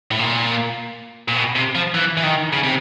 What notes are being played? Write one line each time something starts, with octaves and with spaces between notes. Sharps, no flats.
A2
A#2
A#2
B2
C3
F3
E3
E3
D#3
C#3
C3